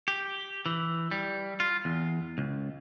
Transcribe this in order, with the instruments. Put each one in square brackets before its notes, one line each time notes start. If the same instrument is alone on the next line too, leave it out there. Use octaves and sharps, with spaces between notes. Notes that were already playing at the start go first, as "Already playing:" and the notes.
[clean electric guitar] G4
E3
G3
F4
E2
C#2